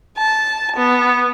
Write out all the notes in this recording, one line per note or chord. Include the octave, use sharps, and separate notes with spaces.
A5
B3